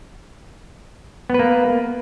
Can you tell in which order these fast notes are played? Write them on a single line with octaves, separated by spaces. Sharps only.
B3 B4 A#3